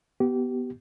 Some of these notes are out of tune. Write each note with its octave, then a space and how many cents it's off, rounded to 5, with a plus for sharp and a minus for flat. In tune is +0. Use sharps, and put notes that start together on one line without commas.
B3 +0 G4 -25